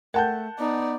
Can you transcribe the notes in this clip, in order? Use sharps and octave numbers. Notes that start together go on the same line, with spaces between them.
A3 A#4 F#5 G5 A5 G6
B3 D#4 D5